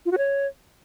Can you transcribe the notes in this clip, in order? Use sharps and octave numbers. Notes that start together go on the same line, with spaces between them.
F4
F#4
C#5